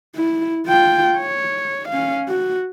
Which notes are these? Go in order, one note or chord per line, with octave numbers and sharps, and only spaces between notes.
E4
F4 G5
C#5
C#4 F5
F#4